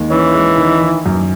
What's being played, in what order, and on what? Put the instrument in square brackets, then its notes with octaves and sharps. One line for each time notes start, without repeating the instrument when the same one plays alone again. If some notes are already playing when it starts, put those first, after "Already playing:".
Already playing: [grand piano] D#2 D#3 G#3
[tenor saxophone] E3 [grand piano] C#4
[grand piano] G#3
D#3
D#3
F#2